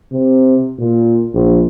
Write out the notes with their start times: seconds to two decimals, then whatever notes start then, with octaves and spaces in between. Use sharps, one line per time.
0.12 C3
0.78 A#2
1.34 A#1